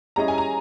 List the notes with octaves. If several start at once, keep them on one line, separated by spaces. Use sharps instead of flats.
G3 C#4 E4 G#4 D#5 A#5
G#5
A#5